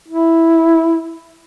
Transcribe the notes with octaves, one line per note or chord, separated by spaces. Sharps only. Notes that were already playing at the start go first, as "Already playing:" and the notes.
E4